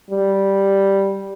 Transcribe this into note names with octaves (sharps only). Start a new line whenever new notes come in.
G3